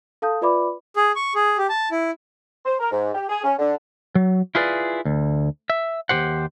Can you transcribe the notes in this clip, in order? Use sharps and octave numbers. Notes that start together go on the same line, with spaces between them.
A4 F5 A5 D#6 G6
F4 B4 D5 E5 B5 D6
G#4
C#6
G#4
G4
A5
E4
C5
A#4
G#2
G4
G#4
C#4
D3
F#3
E4 F4 G#4 B4 C5 D5
D2
E5
D#2 D#3 G4 C5 F#5